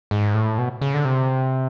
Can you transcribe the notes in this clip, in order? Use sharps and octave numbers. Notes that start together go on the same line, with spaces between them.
G#2
A2
B2
C#3
D3
C3